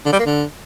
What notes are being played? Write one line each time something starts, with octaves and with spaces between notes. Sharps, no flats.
D3
G3
A#3
D3